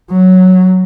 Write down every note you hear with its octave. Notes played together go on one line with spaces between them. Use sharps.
F#3